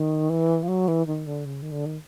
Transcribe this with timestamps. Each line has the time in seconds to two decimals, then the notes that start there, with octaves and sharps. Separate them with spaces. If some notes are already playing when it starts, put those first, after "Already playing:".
Already playing: D#3
0.30 E3
0.63 F3
0.68 F#3
0.88 E3
1.07 D#3
1.27 D3
1.45 C#3
1.62 D#3
1.72 D3
1.86 D#3